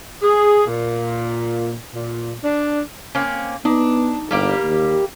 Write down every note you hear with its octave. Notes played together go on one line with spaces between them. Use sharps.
G#4
A#2
A#2
D4
A#3 C4 C#4
B3 D4 D#4
G1 G3 A#3 G4
D#2